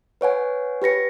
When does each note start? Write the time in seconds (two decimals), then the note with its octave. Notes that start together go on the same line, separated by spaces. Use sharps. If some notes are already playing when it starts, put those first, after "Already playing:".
0.21 B4 C#5 F#5 G#5
0.82 G4 B4 A#6 C#7